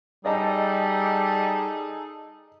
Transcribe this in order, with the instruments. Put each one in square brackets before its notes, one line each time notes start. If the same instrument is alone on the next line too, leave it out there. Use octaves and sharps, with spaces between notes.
[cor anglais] G3 [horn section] D#4 G#4 A4 [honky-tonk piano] D5 D#5 A5